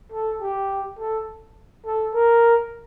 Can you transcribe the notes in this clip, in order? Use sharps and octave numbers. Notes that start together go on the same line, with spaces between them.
A4
G4
A4
A4
A#4